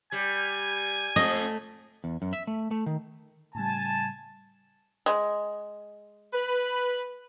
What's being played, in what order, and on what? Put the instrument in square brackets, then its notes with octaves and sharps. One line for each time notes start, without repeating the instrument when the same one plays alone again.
[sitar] G3 [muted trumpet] G#5
[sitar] F2 [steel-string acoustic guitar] A3 [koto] D#5
[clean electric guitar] E2
F#2
E5
A3
A3
D#3
[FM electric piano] A2 C#3 G3 [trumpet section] G#5 A5
[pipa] G#3
[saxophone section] B4